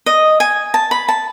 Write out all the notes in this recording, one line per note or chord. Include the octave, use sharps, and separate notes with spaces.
D#5
G#5
A5
B5
A5